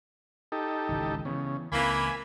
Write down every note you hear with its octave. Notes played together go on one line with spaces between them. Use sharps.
D#4 G4 A4
G#1 C#2 E3
C#3 E3 B3
C#2 E3 G#3 A#3 C4 G#5 B5